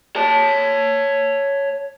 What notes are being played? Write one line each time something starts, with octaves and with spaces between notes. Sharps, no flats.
C#5 A5